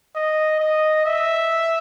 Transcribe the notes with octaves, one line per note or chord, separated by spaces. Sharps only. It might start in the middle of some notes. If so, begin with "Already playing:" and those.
D#5
D#5
E5